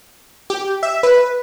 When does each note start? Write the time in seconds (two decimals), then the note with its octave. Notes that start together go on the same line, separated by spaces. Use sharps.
0.50 G4
0.83 E5
1.03 B4